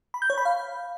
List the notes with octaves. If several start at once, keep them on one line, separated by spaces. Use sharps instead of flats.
B5
G6
C#5
B5
F5